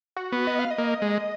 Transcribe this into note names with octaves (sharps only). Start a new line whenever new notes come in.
F#4
B3
D#5
F5
D#5
A#3
G#3